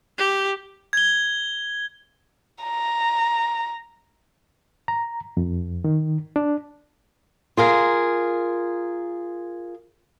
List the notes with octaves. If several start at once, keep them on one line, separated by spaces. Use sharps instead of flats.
G4
G#6 G7
A#5
A#5
F2
D#3
D4
F4 G#4 A#4